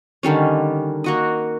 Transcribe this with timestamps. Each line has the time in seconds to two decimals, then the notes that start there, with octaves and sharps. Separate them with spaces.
0.23 D3 D#3 G3 C#4
1.04 A#3 F#4 D#5